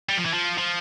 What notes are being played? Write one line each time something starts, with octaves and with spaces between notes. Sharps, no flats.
G3
F3
E3
F3
F3